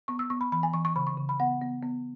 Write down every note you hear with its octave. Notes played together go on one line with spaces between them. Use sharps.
B3 C#6
E6
B3 C#6
B5
E3 B5
G#5
E3 C#6
C#6
C#3 B5
C#6
C#3
B5
B3 F#5
B3
B3